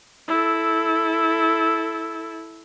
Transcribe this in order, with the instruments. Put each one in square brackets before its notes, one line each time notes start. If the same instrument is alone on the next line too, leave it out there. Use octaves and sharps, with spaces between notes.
[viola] E4 A4